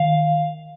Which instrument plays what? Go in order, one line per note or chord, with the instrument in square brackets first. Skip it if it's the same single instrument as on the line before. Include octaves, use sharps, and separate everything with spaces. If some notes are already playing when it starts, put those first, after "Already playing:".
Already playing: [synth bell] D#3 F5